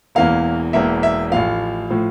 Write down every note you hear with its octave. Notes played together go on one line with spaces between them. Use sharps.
E1 E2 E3 A#3 F5
E1 E2 E3 A#3 E5
E5
A1 A2 F3 F5
A2 F3